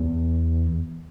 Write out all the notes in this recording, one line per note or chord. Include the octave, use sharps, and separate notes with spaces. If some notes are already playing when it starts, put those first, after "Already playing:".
Already playing: E2